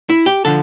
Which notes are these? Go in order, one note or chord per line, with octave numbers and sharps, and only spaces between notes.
E4
G4
D3 F3 A4